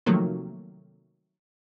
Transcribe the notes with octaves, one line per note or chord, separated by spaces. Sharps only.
C3 D#3 F3 F#3 A3 A#3